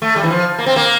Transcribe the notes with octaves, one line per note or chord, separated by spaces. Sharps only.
A3
G3
E3
F3
A#3
C4
A#3